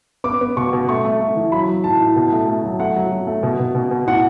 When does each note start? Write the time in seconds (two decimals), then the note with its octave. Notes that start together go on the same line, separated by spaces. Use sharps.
0.24 B3 D6
0.41 B3
0.57 B2 C#6
0.73 B2
0.89 A3 C#6
1.05 A3
1.21 A3
1.36 E3
1.52 F#3 B5
1.69 F#3
1.84 A2 A5
2.00 A2
2.16 B2
2.32 A3
2.48 A3
2.64 F#3
2.79 A3 F#5
2.96 F#3
3.12 F#3
3.27 A3
3.43 B2
3.60 B2
3.75 B2
3.91 B2
4.07 A2 F#5